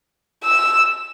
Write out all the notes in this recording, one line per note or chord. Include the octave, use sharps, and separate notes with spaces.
E6